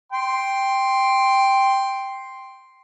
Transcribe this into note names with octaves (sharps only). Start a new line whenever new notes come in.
G5 C6